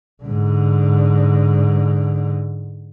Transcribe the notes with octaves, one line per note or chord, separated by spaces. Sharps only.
G#2 D3